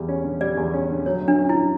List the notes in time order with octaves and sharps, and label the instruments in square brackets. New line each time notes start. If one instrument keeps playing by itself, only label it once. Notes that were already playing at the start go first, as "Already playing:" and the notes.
Already playing: [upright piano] E2 G3
C#4
D3
[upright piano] G3 [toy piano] D5
[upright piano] E2
C#4
D3
[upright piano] F#3 [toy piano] C#5
[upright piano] F#2
[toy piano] D4
[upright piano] C#4
[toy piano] E4
[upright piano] D3